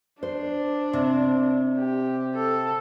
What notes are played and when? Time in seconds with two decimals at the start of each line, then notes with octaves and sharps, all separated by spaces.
0.23 D4 C5
0.93 C3
1.78 G4
2.35 A4